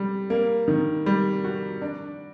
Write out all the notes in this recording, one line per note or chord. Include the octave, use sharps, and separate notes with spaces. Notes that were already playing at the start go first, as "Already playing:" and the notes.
Already playing: G3
A#3
D#3
G3
F#4
D4